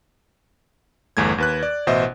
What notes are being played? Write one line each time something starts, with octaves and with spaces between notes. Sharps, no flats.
G1 E2 A3 G#6
D#2 B4 F#6
D5
A1 B2 C5 D#5 E5